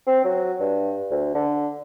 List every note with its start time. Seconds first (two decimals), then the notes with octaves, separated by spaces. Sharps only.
0.07 C4
0.25 F#3
0.60 G2
1.11 D2
1.35 D3